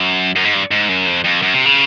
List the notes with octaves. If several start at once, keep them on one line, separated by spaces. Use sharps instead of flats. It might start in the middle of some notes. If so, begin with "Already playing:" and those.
Already playing: F#2
F#2
G#2
G2
G#2
F#2
F2
F2
F#2
C3
C#3